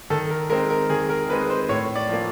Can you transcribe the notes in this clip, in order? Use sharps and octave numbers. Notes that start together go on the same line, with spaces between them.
D#3 A4
A#4
G#3 C4 D#4 A#4
A#4
D#3 G#4
A#4
G#3 C4 D#4 B4
C5
A2 C#5
D5
F3 A#3